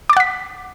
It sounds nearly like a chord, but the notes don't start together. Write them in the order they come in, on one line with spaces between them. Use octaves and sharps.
D6 A6 F#5 B6